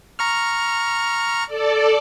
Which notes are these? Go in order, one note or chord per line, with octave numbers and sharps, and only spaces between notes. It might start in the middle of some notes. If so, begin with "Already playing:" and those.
A#5 C#6 F6
A4 D5